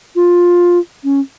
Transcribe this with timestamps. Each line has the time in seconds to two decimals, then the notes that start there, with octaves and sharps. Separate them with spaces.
0.15 F4
1.04 C#4